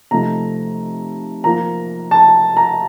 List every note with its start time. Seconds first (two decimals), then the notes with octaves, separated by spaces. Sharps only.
0.11 C3 F3 A3 D#4 A#5
1.44 F3 A#3 F4 A#5
2.11 A5
2.57 A#5